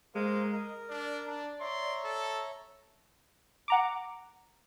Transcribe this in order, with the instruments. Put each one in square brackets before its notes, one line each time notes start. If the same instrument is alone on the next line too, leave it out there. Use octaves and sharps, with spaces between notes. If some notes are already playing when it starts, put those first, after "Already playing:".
[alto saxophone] G#3 [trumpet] A#3 [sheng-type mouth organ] A#4 C5 F5
[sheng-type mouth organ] A#4 [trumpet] D#5
[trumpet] D4 [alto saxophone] D5
[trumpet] D4
[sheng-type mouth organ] C#5 E5 A#5 [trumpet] C6
[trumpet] A4
[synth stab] F#5 A#5 D6